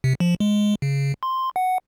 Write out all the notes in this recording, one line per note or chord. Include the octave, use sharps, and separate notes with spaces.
C3
F3
G#3
C#3
C6
F#5